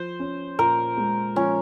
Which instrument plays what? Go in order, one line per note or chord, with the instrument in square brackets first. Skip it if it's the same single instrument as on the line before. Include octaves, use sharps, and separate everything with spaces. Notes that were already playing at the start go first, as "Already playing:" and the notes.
Already playing: [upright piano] F3 [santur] C5
[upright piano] C#4
[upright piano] A#2 [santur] A#4
[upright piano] G#3
[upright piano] F3 [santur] C#4